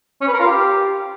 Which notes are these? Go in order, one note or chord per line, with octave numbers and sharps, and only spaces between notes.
C#4
B4
A#4
F4
G4